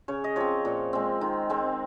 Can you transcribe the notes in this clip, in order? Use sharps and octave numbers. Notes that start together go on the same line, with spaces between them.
C#3 C#5
D#5
F3 C4 C#5
A#2
G#3 C4
D#3
G#3 C4